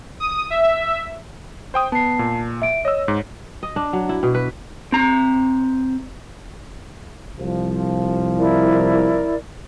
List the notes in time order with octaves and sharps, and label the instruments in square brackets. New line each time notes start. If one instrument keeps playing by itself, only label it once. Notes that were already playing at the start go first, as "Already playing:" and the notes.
[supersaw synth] D#6
E5
[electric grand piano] C5 G5 D#6
[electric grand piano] B3 [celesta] A5 C7
[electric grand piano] A#2
[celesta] E5 D7
[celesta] C#5 [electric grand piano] D#5 E6
[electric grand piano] G#2
[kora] D#5
D4
F#3
E4
B2
B4
[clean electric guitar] C4 A#5
[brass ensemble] C2 F3
[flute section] E4 A#4 D5